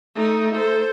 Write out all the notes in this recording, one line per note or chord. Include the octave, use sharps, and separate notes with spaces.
A3 D#4
A4 C5